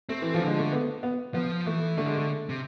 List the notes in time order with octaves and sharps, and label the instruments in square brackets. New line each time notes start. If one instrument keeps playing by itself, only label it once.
[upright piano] A3 [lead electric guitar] C4
[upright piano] E3
[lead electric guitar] E3 [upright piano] F3
[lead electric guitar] D3
[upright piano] G#3
A3
B3
B3
[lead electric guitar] F3 [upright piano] B3
[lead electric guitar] E3 [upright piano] A3
[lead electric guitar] D3 [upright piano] A3
[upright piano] G#3
A3
[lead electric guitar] C3